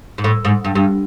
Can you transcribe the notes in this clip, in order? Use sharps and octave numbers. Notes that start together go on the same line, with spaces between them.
G#2
A2
G#2
G2
G2